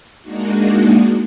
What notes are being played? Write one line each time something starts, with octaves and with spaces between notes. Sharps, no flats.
G#3 A#3 D4 D#4 F#4